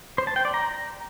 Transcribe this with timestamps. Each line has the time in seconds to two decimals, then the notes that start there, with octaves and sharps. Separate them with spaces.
0.18 C5
0.27 A5
0.36 G5
0.45 D5
0.54 A#5